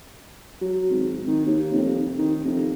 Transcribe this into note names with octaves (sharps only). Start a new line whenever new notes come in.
F#3
G#1
D#3
D#2
F1
D#3
F1